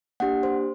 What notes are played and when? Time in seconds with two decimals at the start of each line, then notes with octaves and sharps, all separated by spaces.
0.20 A#3 D4 G4 F#5
0.43 C5